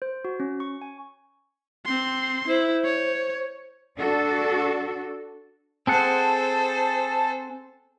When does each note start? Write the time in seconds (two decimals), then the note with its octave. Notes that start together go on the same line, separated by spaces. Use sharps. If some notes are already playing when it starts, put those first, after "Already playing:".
0.02 C5
0.25 F#4
0.40 C#4
0.60 C#6
0.81 G#5
1.86 C4 C6
2.48 E4 C5
2.85 C#5
3.99 D4 F#4 A4
5.87 C4 G#4 A4 C5 F#5 A5